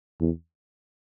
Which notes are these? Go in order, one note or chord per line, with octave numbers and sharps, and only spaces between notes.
E2